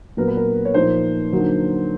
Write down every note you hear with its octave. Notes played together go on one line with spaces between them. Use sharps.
A#2 F#3 B3 A#4
B4
A#4
C#5
A#2 F3 A#3 D#4 C5
D3 F#3 A#3 D#4